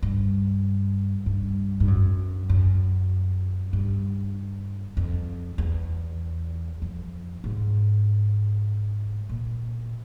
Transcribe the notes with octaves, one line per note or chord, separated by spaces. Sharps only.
G2
G2
G2
F#2
F#2
G2
F2
E2
F2
G#2
A#2